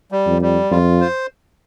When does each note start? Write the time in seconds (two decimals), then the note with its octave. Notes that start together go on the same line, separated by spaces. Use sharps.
0.12 G3
0.27 F2
0.42 G3
0.71 F2 F4
1.01 C5